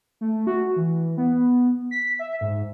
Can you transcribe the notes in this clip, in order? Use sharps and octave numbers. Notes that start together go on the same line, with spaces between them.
A3
F#4
E3
B3
B6
E5
G#2